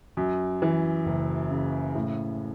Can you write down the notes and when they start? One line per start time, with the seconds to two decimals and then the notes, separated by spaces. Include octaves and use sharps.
0.17 F#2
0.62 E3
1.06 F#1
1.50 C#3
1.95 A2